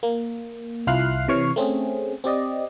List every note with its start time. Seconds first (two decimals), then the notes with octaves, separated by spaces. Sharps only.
0.03 A#3
0.87 C2 E4 F4 F6 F#6 C7
1.28 C3 E3 C#5 C#6 F6 C7
1.56 A3 C4 C#4 G#4
2.24 C4 G4 D5 D#5